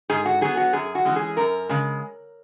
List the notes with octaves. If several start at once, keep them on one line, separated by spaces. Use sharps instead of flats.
G#2 G#4
F#4
F#3 B3 G#4
F#4
F#2 G#4
F#4
E3 G#3 C#4
G#4
F#2 A#4
C#3 G#3